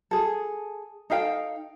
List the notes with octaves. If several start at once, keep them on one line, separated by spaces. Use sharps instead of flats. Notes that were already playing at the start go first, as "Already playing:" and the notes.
G#4 A4
D#4 A4 F5 G5